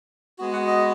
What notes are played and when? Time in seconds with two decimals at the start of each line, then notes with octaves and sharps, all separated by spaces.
0.38 G#3 B3 F#4
0.53 F#5
0.67 D#5